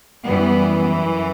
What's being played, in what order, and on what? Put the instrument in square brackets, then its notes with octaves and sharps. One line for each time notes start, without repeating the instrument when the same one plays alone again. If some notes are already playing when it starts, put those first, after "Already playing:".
[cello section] F#2 E3 G3 B3